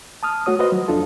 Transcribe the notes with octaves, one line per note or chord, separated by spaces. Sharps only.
A5 D#6 F6
A3 F#4 C#5 D#6
F#4 B4 C5 D#5
F#3
F2 D4 F4 A4